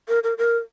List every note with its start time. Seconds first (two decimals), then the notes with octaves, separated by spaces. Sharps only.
0.08 A#4
0.23 A#4
0.38 A#4